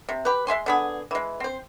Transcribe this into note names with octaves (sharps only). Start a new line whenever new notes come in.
C3
G4 B4
G#3 E5 G#5 C6
D3 B3 G#4
E3 G#3
C4 C5